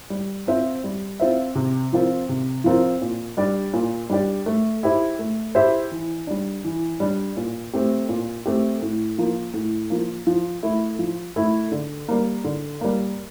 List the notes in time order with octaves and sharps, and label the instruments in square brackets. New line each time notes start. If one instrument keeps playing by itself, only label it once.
[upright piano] G3
C4 F4 C5 E5
G3
C4 F4 C5 E5
C3
F3 C4 F4 A#4
C3
F3 C4 F4 A#4
A#2
G3 D4 G4 D5
A#2
G3 D4 G4 D5
A3
E4 G4 C5 E5
A3
E4 G4 C5 E5
E3
G3 D4
E3
G3 D4
A#2
A3 C4 G4
A#2
A3 C4 G4
A2
F3 A#3
A2
F3 A#3
F3
A3 E4
F3
A3 E4
D3
G3 A#3
D3
G3 A#3